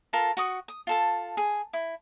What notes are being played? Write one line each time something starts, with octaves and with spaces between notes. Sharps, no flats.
F4 A4 A#4 A5
F#4 C#6 D#6
D#6
F4 A4 A5
G#4
E4